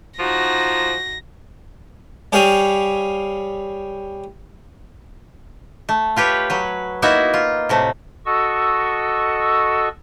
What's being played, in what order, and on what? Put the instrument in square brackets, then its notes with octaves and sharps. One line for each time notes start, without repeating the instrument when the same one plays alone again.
[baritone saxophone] F3 [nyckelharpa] D#4 F#4 [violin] A#6
[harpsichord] G3 G4 G#4 C#5 F5
[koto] A3
F4 G4 B4 C#5
F#3 B4
A#3 B3 D#4 E4 F#4 E5
F4
A2 C3 A3
[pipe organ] F#4 A4 D#5 C#6 E6